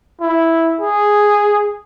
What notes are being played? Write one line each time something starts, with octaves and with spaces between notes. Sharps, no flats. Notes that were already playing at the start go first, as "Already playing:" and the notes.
E4
G#4